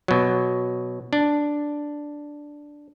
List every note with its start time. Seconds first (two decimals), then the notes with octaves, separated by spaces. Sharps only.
0.08 B2 F#3
1.13 D4